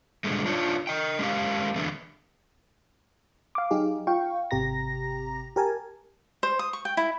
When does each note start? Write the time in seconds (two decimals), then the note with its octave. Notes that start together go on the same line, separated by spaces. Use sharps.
0.24 G#2 B2 D3 G3 G#3
0.46 D4 D#4 F4 C#5
0.87 D#5 G5
1.19 G#3 C#4 E4 G4 F5
1.75 D3 E3 G#3 B3
3.55 F5 D6
3.71 F#3 D#4 G4 G#4
4.07 F4 F5 G5 C#6
4.51 G#1 C3 G4 A#5 A#6
5.56 G4 A#4 G#5 A5
6.43 C5
6.59 D#6
6.73 C#6
6.85 G5
6.97 E4